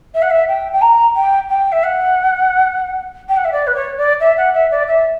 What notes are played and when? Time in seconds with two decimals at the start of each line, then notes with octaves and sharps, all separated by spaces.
0.14 E5
0.22 F#5
0.30 E5
0.48 G5
0.72 G5
0.81 A#5
1.15 G5
1.49 G5
1.72 E5
1.83 F#5
3.28 G5
3.36 F#5
3.44 E5
3.52 D5
3.67 B4
3.75 C#5
3.97 D5
4.20 E5
4.37 F#5
4.54 E5
4.71 D5
4.87 E5